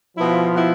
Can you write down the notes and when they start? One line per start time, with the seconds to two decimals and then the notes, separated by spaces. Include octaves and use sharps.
0.16 B2 F3 B3 E4
0.53 B2 B3 E4